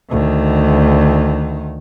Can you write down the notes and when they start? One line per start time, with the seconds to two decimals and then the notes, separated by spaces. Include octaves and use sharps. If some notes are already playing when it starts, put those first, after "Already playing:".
0.11 D2 D#3